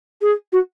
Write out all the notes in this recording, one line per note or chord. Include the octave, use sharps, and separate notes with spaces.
G#4
F#4